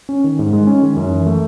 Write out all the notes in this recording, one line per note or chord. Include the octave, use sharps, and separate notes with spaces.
C#4
D#3
G#2
G#3
C#4
D#3
F#2
E3
A3